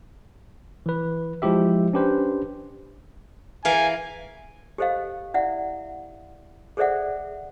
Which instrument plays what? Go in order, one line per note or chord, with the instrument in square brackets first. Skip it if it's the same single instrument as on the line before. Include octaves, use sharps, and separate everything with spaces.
[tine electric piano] E3 B4
F3 G#3 E4 G4 E5
C#4 D4 G4 B4 C5
[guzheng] E3 A#4 F5 [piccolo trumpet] G#5
[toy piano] G4 A4 C5 D#5 F5
E4 D5 E5 F#5
G#4 A4 C5 D5 E5 F#5